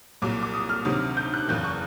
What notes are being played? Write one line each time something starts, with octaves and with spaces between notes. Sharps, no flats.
C2 A#2 F#3 D6
D6
D#6
F6
D2 C3 D#3 F#3
G6
F#6
F#1 E2 C#3 G6
C#6